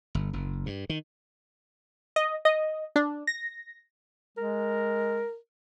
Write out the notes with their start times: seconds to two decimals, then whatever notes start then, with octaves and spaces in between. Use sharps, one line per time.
0.15 G1
0.33 F#1
0.66 G2
0.90 D#3
2.16 D#5
2.45 D#5
2.96 D4
3.27 A#6
4.37 G#3 A#4